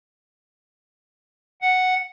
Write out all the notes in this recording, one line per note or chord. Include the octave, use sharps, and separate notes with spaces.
F#5